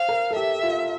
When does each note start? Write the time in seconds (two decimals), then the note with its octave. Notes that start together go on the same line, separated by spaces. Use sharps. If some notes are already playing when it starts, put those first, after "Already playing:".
Already playing: C5 F5
0.09 A#4
0.31 A4
0.35 G4 E5
0.63 F4